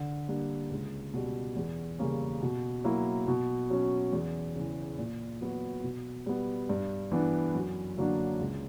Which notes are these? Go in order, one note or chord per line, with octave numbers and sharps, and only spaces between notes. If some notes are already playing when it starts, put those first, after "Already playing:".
Already playing: D3
G3 A#3 D4
C#2
B2 G3
E2
C#3 G3 A#3 C#4
B2
F#3 A#3 E4
B2
F#3 C#4
E2
C#3 E3
A#2
F#3 B3 F#4
B2
G3 B3
G2
E3 B3 D4
F#2
D3 F#3 A#3 D4
C#2